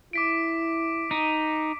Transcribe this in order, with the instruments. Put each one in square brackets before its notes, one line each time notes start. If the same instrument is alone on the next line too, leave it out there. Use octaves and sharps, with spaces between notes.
[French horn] E4 [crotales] D6 B6 D7
[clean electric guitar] D#4